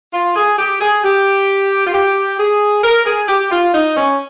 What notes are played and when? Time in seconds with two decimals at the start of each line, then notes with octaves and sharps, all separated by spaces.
0.13 F4
0.36 G#4
0.58 G4
0.80 G#4
1.04 G4
1.86 F4
1.93 G4
2.39 G#4
2.83 A#4
3.05 G#4
3.28 G4
3.51 F4
3.73 D#4
3.97 C#4